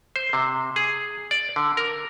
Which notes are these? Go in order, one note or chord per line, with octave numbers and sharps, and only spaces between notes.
C5
C3
G#4
D5
D3
A#4